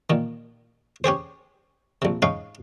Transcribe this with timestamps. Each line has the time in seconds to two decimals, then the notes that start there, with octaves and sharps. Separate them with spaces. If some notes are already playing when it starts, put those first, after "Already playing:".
0.10 A#2 D#3
1.04 C#4 G4 G#4 C5
2.02 A#1 C3
2.22 G#2 C#4 D#4 F5